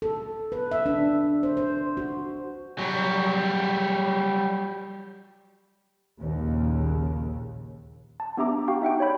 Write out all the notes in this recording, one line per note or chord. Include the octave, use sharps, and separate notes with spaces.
A4
B4
E5
D4
C5
C5
F#4
F#3 G3
A#1 D#2 C#3
A5
B3 D4 G4 E5 A#5 D6
F#4 G4 F5 G5 C#6
D#4 E5 F#5 G5
C#5 D5 B5 G6